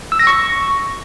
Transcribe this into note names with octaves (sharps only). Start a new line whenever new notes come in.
E6
A#6
C#6